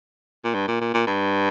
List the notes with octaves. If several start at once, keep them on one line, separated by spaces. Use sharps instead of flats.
A#2
G2
A#2
A#2
A#2
G2